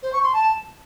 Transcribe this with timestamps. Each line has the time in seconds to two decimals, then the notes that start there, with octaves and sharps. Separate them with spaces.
0.02 C5
0.12 C#6
0.22 C6
0.33 A5